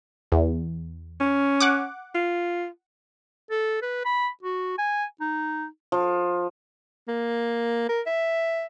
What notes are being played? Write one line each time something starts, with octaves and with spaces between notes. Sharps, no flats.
E2
C#4
F#5 D6
F4
A4
B4
B5
F#4
G#5
D#4
F3
A#3
A#4
E5